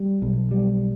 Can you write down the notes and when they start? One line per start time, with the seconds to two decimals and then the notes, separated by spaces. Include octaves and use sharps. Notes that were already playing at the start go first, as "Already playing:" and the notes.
Already playing: G3
0.22 B1
0.51 G3